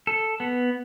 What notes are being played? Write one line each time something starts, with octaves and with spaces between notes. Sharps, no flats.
A4
B3